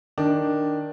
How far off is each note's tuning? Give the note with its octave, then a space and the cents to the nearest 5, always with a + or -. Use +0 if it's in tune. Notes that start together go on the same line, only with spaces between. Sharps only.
D#3 +0 D4 +0